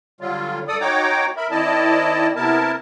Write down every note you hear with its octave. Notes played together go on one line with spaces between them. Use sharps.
D3 F#3 G3 F4
G2 A4 D5 D#6
D#4 F#4 C#5 G5 A#5 D6
A#4 E5 B5
D#3 C4 E4 D5 D#5 A5
C3 B3 E4 A#4 A5